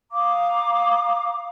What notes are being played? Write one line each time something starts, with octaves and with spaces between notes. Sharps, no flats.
F5 A#5 D6 D#6